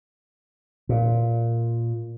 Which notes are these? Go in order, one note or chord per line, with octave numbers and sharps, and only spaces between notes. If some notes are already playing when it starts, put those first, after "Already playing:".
A#2